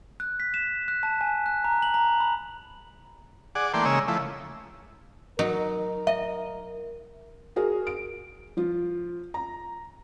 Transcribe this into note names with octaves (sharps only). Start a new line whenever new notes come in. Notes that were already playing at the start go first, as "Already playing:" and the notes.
F#6
B6
E7
F#6
A5
G#5
F#6
A#5
F#7
A#5
B5
G#4 D5 F#5
E3 A3 A#3 D5 G5 C6
C#3 G#3 A#3 C#5 D#5 E6
F3 A3 E4
F#3 D#4 A#4
D#5 E5
F#4 G#4 A#4
D7
F3 F4
A#5